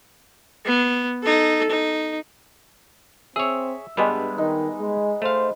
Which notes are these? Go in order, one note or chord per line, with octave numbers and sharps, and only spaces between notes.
B3
D#4 A4
D#4
C4 G#4 C#5 E5
G2 G3 G#3 B3 D4 B4
D#3 D#4
G#3
A3 C5 F5